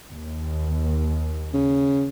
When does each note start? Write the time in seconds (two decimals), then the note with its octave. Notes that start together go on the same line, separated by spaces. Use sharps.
0.13 D#2
1.54 C#3